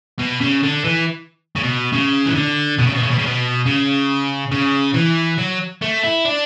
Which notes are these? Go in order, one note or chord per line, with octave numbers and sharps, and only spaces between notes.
B2
C#3
D3
E3
C#3
B2
C#3
E3
D3
B2
C#3
B2
C#3
B2
C#3
B2
C#3
C#3
E3
F#3
A3
E4
D4